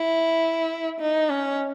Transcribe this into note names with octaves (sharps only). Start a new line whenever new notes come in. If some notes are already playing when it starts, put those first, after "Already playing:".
Already playing: E4
D#4
C#4